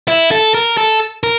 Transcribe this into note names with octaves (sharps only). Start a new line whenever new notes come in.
E4
A4
A#4
A4
A#4